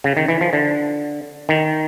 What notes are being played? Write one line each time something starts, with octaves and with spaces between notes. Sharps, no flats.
C#3
D#3
E3
F3
D3
D#3